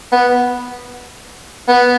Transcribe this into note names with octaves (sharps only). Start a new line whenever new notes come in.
B3
B3